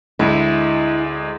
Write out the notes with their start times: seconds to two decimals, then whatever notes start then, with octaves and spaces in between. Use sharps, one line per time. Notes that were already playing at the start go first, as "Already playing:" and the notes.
0.19 D2 G#3 E4